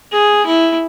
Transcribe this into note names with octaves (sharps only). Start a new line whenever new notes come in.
G#4
E4